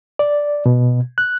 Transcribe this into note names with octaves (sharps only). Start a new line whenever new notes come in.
D5
B2
F#6